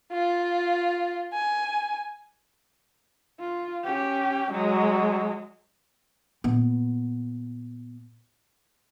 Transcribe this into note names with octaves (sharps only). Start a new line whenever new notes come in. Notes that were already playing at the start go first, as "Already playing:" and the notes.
F4
G#5
F4
C#4 G4
F#3 G#3
A#2 B3